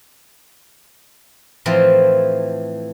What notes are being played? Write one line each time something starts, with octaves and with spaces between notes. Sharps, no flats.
A2 E3 F3 C4